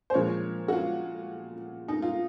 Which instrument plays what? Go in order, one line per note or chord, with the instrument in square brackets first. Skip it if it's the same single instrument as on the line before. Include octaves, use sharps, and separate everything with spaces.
[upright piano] C5
A#2 F3 G#3 C#5
F#4
F4
D#4
F4